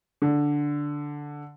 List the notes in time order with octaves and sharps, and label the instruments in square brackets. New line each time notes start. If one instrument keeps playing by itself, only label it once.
[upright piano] D3